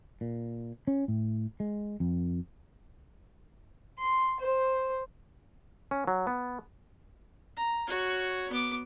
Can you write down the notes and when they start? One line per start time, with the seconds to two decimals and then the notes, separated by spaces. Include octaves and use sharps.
0.21 A#2
0.87 C#4
1.08 A2
1.60 G#3
2.00 F2
3.99 C6
4.41 C5
5.91 C#4
6.07 F#3
6.27 B3
7.57 A#5
7.87 F#4 C#5
8.51 B3 D6